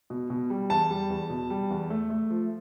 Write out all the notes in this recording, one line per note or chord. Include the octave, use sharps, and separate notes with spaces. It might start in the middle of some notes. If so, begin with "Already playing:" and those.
B2
B2
G3
E2 A5
G3
E2
B2
G3
E2
A3
A3
F3